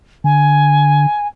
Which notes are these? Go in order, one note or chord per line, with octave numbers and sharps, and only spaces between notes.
D3 G#5